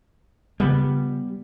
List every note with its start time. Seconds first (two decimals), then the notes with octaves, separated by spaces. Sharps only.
0.60 C#3 G3 B3 F4